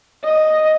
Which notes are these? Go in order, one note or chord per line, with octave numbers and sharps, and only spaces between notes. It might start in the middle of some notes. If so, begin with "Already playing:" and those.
D#5